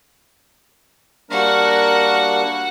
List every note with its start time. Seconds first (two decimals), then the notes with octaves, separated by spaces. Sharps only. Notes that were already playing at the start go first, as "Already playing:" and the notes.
1.31 G3 A#3 D4 F#4 A#4 F#5